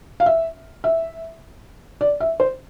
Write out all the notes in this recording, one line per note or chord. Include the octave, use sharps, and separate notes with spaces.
F5
E5
E5
D5
E5
C5